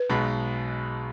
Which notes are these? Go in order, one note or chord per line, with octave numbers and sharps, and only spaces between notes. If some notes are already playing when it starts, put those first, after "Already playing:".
Already playing: B4
B1 B2 G#3 B3